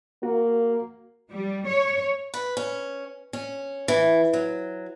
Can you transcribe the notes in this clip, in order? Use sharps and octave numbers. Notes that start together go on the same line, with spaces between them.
A#3 F#4
G3
C#5
B4
C#4
C#4
E3
F#3